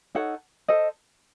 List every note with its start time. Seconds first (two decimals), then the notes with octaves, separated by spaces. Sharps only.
0.15 D#4 A4 C#5 F#5
0.68 A4 C5 D#5